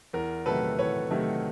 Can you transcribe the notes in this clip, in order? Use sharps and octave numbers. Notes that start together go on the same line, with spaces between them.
E2 A#4
C3 D#3 F#3 A3 A4 B4
E2 B4 C#5
C3 D#3 F#3 A3